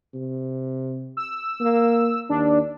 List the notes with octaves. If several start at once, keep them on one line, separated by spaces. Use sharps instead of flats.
C3
E6
A#3
D#2 D4